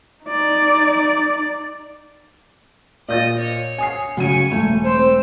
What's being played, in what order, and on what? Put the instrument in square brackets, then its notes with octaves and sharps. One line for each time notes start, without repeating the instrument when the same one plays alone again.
[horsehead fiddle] D#4 D5
[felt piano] A#2 G6 A6 [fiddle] D#5
[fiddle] C#5
[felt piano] G#5 D#6 C7
[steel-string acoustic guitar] C#3 F5 G5 [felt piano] F#3 D#7 [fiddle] G#5 C#6
[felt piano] E1 [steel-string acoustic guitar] A3
[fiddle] C4 E6 [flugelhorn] C5